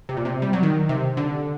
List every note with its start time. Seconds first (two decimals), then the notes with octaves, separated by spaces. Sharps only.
0.09 C3
0.17 A#2
0.25 C3
0.42 G3
0.53 F#3
0.63 D#3
0.89 C3
1.17 D3